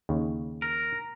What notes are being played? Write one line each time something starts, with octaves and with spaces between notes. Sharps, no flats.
D#2 C#3
A#4